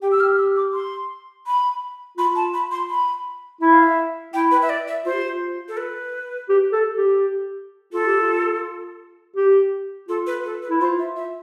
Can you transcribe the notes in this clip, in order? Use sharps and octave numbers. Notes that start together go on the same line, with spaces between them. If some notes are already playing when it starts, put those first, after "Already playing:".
G4 G5
E6
F6
E6
D6
C6
B5
F4 B5
A5
B5
C6
B5
E4 E5
F5
E5
E4 G5
B4
E5
D5
E5
F4 C5
G4
F4
A4
B4
G4
A4
G4
F4 A4
G4
F4
G4
F4 A4
B4
A4
B4
E4
F4 C5
E5
E5